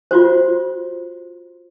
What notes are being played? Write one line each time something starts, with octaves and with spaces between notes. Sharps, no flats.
F4 F#4 C5